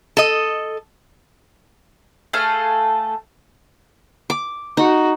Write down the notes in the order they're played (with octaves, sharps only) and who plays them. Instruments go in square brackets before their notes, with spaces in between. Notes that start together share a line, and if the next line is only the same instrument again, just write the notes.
[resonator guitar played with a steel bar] A4 D#5
[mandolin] A3 G#4 A4 F5
[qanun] D6
[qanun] D#4 [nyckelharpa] F#4